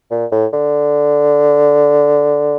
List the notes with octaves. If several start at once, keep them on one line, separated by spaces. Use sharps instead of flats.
A#2
A2
D3